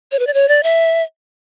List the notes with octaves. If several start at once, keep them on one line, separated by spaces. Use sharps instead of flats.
C#5
B4
D5
C#5
D5
E5